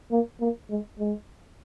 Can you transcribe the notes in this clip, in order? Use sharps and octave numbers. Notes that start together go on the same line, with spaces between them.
A#3
A#3
G#3
G#3